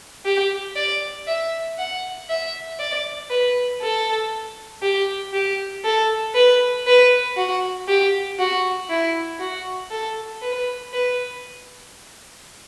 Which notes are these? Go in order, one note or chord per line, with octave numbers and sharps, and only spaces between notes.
G4
D5
E5
F#5
E5
D5
B4
A4
G4
G4
A4
B4
B4
F#4
G4
F#4
E4
F#4
A4
B4
B4